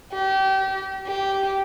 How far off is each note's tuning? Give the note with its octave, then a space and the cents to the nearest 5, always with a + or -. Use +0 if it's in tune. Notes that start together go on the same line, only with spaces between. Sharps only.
G4 -30
G4 -10